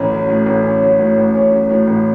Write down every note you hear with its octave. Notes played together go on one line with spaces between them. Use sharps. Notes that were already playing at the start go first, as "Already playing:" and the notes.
Already playing: A1 C#4
F#3
A2
A1
C#4
F#3
A2
A1
C#4
F#3
A2
A1